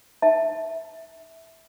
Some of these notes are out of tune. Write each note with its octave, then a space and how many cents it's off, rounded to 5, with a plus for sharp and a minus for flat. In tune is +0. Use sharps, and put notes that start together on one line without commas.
E5 -10 A5 +0